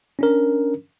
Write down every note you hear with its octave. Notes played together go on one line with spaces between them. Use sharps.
C#4 D4 A#4